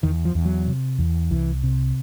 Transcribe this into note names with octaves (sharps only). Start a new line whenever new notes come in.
E2 D#3
F3
E2
F#3
C3
E2
C2 E3
C3